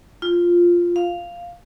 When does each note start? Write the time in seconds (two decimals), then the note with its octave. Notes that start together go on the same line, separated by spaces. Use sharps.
0.22 F4
0.96 F5